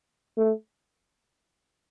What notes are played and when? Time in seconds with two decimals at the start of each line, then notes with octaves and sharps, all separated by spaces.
0.37 A3